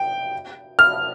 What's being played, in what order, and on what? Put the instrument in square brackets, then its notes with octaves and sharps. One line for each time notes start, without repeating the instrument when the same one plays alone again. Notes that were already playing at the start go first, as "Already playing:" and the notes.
Already playing: [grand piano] G5
F6